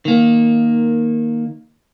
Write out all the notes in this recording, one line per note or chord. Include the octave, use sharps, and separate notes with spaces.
D#3 A#3